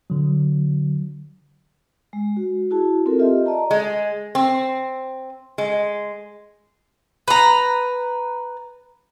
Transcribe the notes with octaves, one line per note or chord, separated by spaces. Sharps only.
D3 F#3
G#3
F#4
E4 F#4 G#4 A5
C4 F4 A4 A#4
F4 G4 D#5 E5
D5 D#5 A5 A#5
G#3
C4
G#3
B4 A#5